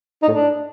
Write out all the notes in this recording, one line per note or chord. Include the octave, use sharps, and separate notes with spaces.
D#4
A2
D4